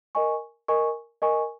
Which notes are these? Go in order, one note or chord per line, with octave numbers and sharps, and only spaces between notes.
A#4 D#5 G#5 C#6
A#4 D#5 G#5 C#6
A#4 D#5 G#5 C#6